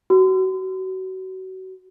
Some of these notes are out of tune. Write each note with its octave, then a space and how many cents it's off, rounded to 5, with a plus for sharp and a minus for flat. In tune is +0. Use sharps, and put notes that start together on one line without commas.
F#4 +30